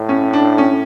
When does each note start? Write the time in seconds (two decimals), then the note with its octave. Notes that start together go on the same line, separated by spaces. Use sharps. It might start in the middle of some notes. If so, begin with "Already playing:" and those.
Already playing: A2
0.09 C#4
0.33 D4
0.58 C#4